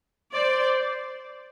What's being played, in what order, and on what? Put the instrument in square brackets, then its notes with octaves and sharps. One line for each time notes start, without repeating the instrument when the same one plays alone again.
[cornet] C5 [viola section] D5